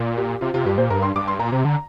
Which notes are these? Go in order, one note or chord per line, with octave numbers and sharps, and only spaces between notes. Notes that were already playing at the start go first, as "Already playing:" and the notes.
Already playing: A#2
G4
C3 F4
C3 F4
G2 G4
A#2 C5
G2 A#4
C6
G2 D6
C6
A#2 A#5
C3
D3